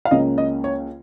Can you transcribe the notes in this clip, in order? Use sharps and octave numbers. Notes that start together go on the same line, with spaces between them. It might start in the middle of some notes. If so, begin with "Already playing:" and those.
F5
C#2 C#3 A#3 C#4 D#5
D#5
C#5